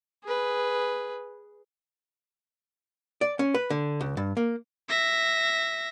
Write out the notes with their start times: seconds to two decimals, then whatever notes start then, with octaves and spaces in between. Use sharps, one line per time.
0.24 G#4 B4
3.21 D5
3.39 C#4
3.54 B4
3.70 D3
4.01 C#2
4.17 G2
4.37 A#3
4.89 E5 A#6